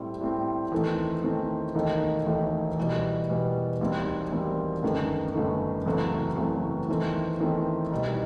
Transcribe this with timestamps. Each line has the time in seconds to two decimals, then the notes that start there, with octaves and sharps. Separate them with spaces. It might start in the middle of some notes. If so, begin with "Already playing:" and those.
Already playing: A2 G3 C4
0.21 A2 G3 C4
0.72 E2 D#3 A3 C4
1.23 E2 D#3 A3 C4
1.75 E1 D#2 D#3 A3 D#4
2.26 E1 D#2 D#3 A3 D#4
2.78 E2 B2 G3
3.29 E2 B2 G3
3.80 E1 D#2 D#3 G3 C4
4.31 E1 D#2 D#3 G3 C4
4.83 G1 F#2 D#3 A3
5.34 G1 F#2 D#3 A3
5.86 F#1 E2 C3 F#3 A3
6.37 F#1 E2 C3 F#3 A3
6.88 E2 D#3 A3 C4
7.40 E2 D#3 A3 C4
7.92 C2 B2 G3 D#4